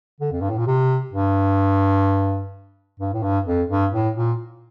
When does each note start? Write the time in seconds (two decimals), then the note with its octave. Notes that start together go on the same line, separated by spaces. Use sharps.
0.21 D3
0.32 F2
0.41 G2
0.50 A2
0.58 A#2
0.67 C3
1.13 G2
3.00 G2
3.13 A2
3.23 G2
3.46 F2
3.70 G2
3.93 A2
4.16 A#2